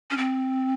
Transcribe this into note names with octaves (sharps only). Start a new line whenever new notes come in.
C#4
C4